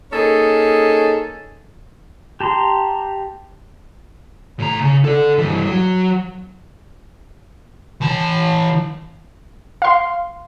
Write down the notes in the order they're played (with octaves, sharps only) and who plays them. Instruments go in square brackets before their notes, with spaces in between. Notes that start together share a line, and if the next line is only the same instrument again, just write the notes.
[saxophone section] A#3 C#4 D#4 G#4 A4
[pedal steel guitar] G4 A5 A#5 C6
[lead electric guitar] A2 A#5
C#3
A4 D5
G2 E3
F#3
[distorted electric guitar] E3 A5
[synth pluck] F5 C6